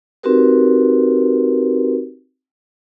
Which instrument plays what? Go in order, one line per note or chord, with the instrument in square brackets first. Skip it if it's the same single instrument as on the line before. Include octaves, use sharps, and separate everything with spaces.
[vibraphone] C4 D#4 F#4 G4 A#4 B4